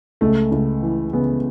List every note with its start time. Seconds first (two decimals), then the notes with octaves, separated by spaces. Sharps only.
0.21 C#2 A3
0.52 C#2
0.82 E3
1.13 C#3 B3